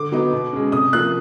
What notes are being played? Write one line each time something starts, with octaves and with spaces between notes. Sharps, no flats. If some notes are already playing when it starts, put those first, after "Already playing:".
Already playing: D3 D6
F#3 B3 D#4
B2
G#3 C#4
C3 D#6
F3 A#3 F#6